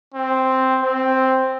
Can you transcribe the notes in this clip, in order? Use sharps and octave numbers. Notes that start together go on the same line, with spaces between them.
C4
C4